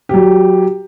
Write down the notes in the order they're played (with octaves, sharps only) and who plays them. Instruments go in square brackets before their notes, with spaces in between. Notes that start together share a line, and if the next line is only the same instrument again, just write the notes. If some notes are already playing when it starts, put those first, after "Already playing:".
[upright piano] F#3 G4